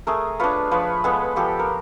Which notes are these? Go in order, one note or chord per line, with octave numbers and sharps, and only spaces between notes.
A3 G#4 A#4
D4 F4 B4 C#5
F3 B4 C#5
G#3 B3 A4 B4
F3 G4 A4
A#4